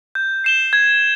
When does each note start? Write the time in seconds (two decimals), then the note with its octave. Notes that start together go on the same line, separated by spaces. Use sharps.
0.15 G6
0.44 C7 E7 G7
0.73 G#6